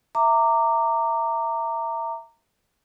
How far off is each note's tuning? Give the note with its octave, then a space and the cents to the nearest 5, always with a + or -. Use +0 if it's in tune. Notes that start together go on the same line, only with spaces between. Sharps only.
E5 +0 A#5 -20 D6 +0